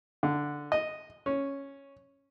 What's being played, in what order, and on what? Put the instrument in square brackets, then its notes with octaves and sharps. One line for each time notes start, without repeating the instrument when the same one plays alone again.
[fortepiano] D3
D#5
C#4